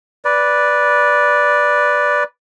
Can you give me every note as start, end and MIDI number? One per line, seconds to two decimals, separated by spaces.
0.25 2.24 71
0.25 2.24 74